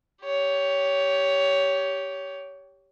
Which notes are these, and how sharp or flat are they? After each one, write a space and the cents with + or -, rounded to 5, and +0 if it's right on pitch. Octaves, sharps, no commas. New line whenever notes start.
G4 +0 C#5 +15